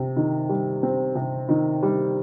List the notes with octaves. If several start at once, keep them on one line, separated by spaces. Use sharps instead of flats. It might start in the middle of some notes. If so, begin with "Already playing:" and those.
Already playing: C3
D#3
G3
C4
C3
D#3
G3